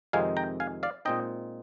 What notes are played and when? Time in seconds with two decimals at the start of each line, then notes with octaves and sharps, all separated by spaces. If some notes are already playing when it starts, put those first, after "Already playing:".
0.13 F2 C3 D#3 G#3 D#4 F5 G#5
0.37 G5 A#5
0.60 F5 G#5
0.83 D5 F5
1.05 A#2 G#3 C4 D#4 D#5 G5